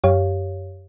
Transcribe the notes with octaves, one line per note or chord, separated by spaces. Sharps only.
F#2 G4 C#5 F5